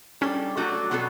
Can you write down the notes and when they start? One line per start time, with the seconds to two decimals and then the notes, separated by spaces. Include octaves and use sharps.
0.21 G3 C#4 D4 A4
0.57 F#3 A3 D4 F#4 A4
0.91 B2 F#3 B3 F#4 A4